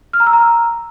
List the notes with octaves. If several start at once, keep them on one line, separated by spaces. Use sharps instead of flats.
F6
A#5
E6
A#5